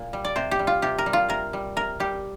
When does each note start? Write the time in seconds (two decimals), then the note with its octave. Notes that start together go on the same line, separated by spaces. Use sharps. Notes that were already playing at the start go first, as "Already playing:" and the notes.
Already playing: A#2
0.13 G3
0.25 D5
0.36 C3 C5
0.51 G4
0.59 G3
0.67 F4
0.82 C3 G4
0.98 A#4
1.06 G3
1.13 F4
1.29 C3 A#4
1.53 G3
1.76 C3 A#4
2.00 G3 G4